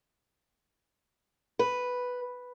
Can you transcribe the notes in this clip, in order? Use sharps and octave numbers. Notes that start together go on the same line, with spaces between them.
B4